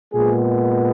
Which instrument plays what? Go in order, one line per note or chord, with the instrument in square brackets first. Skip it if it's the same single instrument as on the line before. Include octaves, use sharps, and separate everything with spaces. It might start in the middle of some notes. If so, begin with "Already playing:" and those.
[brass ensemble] A#2 G#3 B3 G#4